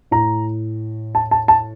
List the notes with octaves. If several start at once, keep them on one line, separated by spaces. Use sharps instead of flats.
A2 A#5
A5
A5
A5